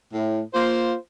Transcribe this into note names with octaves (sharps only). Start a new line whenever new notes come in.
A2
A#3 F4 C5